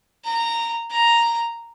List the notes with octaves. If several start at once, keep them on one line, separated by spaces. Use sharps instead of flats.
A#5
A#5